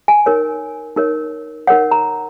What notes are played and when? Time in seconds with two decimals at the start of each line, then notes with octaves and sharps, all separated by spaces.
0.08 G#5
0.26 D#4 A#4 C#5
0.97 D#4 A#4 C#5
1.67 D#4 A#4 C#5 F#5
1.91 A#5